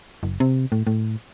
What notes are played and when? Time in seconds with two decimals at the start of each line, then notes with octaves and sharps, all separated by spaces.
0.23 F#1
0.40 C3
0.72 A2
0.87 A2